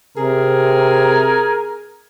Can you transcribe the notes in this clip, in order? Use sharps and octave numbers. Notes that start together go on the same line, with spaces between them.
C3 G#4 A#4